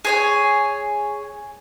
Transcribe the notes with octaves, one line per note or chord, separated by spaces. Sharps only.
G#4 C#5 G#5